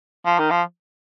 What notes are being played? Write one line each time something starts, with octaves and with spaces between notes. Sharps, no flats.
F3
D#3
F3